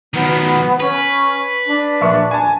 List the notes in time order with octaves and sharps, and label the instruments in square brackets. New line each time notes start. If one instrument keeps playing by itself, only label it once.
[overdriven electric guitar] D#3 F#3 [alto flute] B3
[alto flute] C#4 [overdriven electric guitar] B4
[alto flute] D4
[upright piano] A#1 E5 C#6
G#5 A5